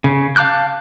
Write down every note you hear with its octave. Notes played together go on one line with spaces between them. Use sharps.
C#3
F5 A5 D6 F#6 G6